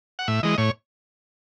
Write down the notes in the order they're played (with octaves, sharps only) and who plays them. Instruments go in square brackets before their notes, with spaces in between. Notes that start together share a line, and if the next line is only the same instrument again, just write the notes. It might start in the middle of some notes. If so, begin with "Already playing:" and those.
[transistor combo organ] F#5
A2 E5
E3 G#3 D#5
A2 C#5